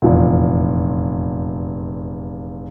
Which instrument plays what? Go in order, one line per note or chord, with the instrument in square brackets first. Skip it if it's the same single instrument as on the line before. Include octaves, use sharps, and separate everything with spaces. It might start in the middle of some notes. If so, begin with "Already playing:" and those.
[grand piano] F1 E2 A#2